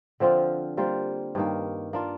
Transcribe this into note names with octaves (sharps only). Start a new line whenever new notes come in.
D3 F3 C4 F4
G3 A#3 F4 C5
G2 D#3 A#3
A#3 D4 F4